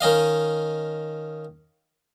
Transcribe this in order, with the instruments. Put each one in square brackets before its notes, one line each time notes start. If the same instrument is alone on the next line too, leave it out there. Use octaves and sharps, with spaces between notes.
[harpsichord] D#3 C#4 D#5 F5